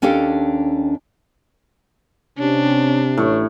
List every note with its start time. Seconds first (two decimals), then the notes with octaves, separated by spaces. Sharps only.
0.02 D#2 C#4 D4 G4 A4 F5
2.39 C3 C#4 D4
3.18 A1 A2 C#5